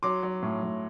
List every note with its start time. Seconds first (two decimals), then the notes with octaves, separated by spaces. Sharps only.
0.03 F#3 C6 D6
0.23 F#3
0.42 A2
0.63 A2